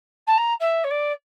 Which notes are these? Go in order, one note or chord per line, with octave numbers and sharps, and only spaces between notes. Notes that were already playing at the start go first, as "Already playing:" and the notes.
A5
A#5
E5
C#5
D5